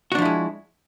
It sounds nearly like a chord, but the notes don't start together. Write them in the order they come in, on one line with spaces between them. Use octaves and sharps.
F#4 D4 F3 E4 G#3